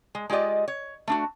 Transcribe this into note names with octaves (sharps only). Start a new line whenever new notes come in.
G#3
G#3 F4 G4 D5 D#5
C#5
A3 D4 F#4